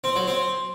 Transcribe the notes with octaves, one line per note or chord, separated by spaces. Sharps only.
C4
F#3
C4